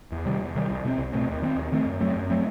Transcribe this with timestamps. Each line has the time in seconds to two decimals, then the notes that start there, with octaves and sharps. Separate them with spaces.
0.12 E2
0.25 C3 D#3 G3
0.40 E2
0.55 C3 D#3 G3
0.70 C2
0.84 B2 A3 C4
0.98 C2
1.13 B2 A3 C4
1.28 D#2
1.42 D#3 A3 C4
1.56 D#2
1.72 D#3 A3 C4
1.86 F#2
2.00 F#3 A3 C4
2.16 F#2
2.30 F#3 A3 C4